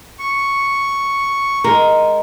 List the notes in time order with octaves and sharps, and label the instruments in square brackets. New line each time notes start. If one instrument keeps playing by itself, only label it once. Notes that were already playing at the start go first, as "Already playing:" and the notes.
[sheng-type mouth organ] C#6
[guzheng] G#3 [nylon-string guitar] A#4